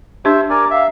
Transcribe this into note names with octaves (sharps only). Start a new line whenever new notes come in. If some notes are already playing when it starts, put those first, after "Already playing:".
D4 G4 C5 E5
A#4 D5 G#5 A#5 D6
E5 F5